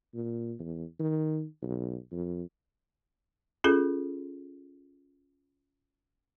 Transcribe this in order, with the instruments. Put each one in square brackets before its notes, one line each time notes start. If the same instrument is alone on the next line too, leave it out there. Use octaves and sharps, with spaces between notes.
[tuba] A#2
E2
D#3
B1
F2
[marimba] C#4 F4 G#4 A4